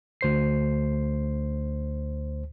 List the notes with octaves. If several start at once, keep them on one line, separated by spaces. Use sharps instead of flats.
D2 C5 C7